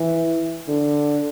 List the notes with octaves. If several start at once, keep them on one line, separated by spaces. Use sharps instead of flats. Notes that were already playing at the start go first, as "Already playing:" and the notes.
Already playing: E3
D3